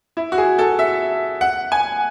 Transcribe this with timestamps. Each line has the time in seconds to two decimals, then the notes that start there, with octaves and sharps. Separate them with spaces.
0.17 E4
0.32 F#4
0.38 G#4
0.59 A4
0.79 E5
1.41 F#5
1.72 G#5